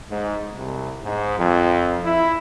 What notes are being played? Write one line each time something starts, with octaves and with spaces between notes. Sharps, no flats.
G#2
C2
G#2
F2
E4